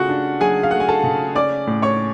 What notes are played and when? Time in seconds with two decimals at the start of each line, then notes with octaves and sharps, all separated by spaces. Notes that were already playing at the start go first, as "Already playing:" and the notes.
Already playing: C#3 A3 F4 F#4 F#5
0.09 D4
0.40 F#3 G#4 G#5
0.63 F5
0.71 A3 F#5
0.80 G#5
0.89 A4 A5
1.04 C#3
1.35 C#4 D5 D6
1.67 A2
1.82 C#5 C#6